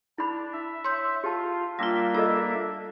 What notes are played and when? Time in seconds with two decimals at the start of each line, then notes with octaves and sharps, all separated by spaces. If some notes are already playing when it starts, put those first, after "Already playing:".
0.18 D4 E4 B5
0.53 E5
0.84 C#5 C6 E6 G6
1.24 F4 G4 A5
1.79 G3 A#3 D4 F4 E5
2.15 F4 A4 D#5 E6